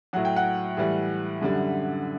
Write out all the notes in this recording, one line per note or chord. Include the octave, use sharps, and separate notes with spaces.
A2 F#3 F#5
G5
F#5
A2 E3 G3
F#2 D3 G3